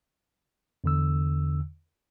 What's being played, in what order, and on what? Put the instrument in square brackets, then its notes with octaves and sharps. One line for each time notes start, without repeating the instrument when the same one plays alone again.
[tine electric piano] E2 D3 E6